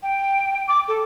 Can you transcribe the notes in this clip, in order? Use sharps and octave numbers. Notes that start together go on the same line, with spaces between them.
G5
D6
A4